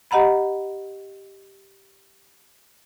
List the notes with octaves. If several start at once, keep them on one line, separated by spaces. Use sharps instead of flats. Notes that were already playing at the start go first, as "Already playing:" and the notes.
G4 D#5 F#5 A#5 B5